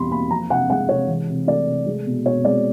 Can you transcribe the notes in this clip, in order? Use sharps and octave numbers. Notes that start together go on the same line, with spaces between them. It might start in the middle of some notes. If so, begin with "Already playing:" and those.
Already playing: E2 B2 G3 B5 C6
A#3 B5
F3 A#5
C3 F#5
G#3 F#5
C3 C#5
E3
C3
A3 D5
C3
G#3
B2
B2 C#5
G#3 D5